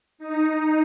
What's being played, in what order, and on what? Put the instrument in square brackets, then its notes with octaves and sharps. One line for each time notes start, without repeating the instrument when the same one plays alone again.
[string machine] D#4